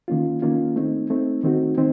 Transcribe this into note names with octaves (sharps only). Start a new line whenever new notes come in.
D#3 A#3 C#4 F4
D#3 A#3 C#4 F4
A3 C4 D#4
A3 C4 D#4
D#3 A3 C4 D#4 F#4
D#3 C4 D#4